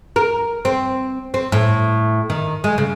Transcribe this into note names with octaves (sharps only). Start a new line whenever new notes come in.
A#4
C4
C4
A2
D#3
G#3
C#3